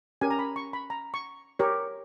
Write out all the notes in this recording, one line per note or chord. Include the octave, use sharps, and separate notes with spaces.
C#4 G4 A#4 G#5
A#5
B5
C#6
B5
A#5
C#6
G4 A#4 C#5